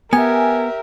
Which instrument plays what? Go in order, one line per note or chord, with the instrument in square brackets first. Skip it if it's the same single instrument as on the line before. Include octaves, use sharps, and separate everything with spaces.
[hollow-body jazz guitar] B3 [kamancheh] G4 E5 [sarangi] A#4 [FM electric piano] G#5